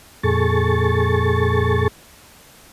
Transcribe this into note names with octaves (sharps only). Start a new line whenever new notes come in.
F2 A#2 G#4 A4 C#6 A6